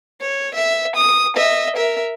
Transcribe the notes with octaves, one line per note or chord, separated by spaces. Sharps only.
C#5
E5
D#6
D#5 E5
A#4 E5